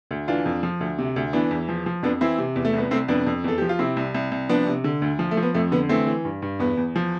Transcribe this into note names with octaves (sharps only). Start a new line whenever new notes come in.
D2
E3 D4 F4
F2
F3
D2
C3
D2
E3 B3 D4
E2
F3
F3
F2 B3 D4
E3 C4 E4
C3
E2
A3
C2 B3
C2 A3 C4
F2 B3 D4
F2
E2 A4
F3 G4
F4
C3 C4 E4
C2
C2
C2
F3 B3 D4
C3
D3
D2
F3
A3
F3
B3
F2 A3
D3 B3
E3 A3 C4
E3
G2
G2
E2 B3
E2
F3